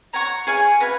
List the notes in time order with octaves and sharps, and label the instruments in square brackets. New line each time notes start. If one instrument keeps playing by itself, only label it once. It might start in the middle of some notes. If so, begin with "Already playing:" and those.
[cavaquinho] C#5 F#5 C#6 [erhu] A#5
[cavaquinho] G#4 C#5 F5 [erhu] G#5
[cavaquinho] F#4 B4 F5 G#5